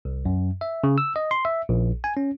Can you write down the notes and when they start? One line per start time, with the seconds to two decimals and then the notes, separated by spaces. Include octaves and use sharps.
0.05 C2
0.25 F#2
0.61 E5
0.84 C#3
0.98 E6
1.16 D#5
1.31 C6
1.45 E5
1.69 A#1
2.04 G#5
2.17 C#4